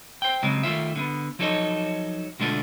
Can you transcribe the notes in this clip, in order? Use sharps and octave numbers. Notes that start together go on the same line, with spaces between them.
C5 G5
C#3 F#3 G#3 C4
D#3 A3 F4 E5
D3 A#3 B3
F3 F#3 D#4 A4 C#5 D#5
B2 D3 G#3 A3 D4 F4